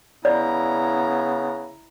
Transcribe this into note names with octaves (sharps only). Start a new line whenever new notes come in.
C#3 B3 E4 D5 A#5